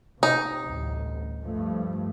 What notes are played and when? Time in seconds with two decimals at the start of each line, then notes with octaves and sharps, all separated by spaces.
0.23 C3 D#4
0.64 A1 D2 G2
1.43 G2 F3 A3